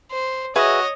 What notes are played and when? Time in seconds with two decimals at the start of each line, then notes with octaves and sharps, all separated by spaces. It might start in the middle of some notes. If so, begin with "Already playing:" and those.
0.11 C5
0.56 F#4 G#4 B4 C#5 D#5 E5